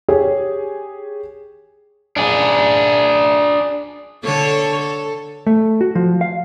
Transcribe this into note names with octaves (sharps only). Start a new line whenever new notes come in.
G4 G#4 C#5
D4 G#4
D3 A4 C#5
A4
A3
F#4
F3
F5